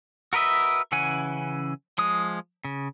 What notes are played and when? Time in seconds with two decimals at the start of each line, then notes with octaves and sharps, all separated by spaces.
0.33 F#4 A#4 B4 D#5 E5
0.92 C#3 E3 C#4 F#5 G#5
1.98 F3 G#3 D#6
2.65 C#3